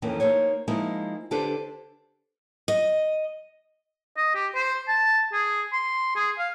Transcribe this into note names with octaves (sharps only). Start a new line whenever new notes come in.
F2 D#3 E3 A#3 C#4
A#3 D#4 C5 C#5
F3 G#3 A#3 D#4 E4
D3 D4 G4 A4 B4 C5
D#5
D#5
G4
C5
A5
G#4
C6
G#4
F5